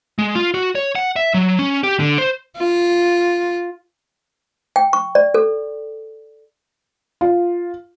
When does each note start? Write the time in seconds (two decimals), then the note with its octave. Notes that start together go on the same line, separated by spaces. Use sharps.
0.18 G#3
0.35 F4
0.54 F#4
0.75 C#5
0.95 F#5
1.16 E5
1.34 F#3
1.59 C#4
1.83 G4
1.99 D3
2.18 C5
2.57 F4
4.76 G5
4.93 C#6
5.15 D5
5.34 A4
7.21 F4